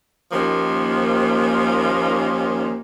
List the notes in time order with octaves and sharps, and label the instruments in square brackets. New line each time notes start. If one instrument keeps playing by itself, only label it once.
[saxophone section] D#2 D#3 F3 A#3 C#4